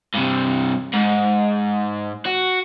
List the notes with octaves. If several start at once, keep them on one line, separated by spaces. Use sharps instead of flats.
G2 C3
G#2
F#4